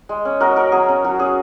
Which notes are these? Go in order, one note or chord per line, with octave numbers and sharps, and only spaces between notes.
G#3
C#4
G#3 F#4 A#4
C#4 F#4 A#4
F#3 G#4 C#5
C#4
F#3 F#4
C#4 G#4